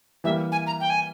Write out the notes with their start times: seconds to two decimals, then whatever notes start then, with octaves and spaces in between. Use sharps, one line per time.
0.24 E3 G3 A#3 E5
0.52 G#5
0.67 A#5
0.80 G5
0.90 G#5